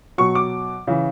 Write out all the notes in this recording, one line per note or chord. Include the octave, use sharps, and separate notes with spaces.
B2 F#3 C#6
D6
C#3 E3